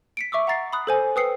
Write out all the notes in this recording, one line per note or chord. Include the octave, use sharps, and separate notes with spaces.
B6 C#7 D7
E5 C#6 D6 E6
F#5 A#5 A6 C7
B5 D#6 F#6
A4 C5 G#5
B4 G5 D#6 E6 C7 C#7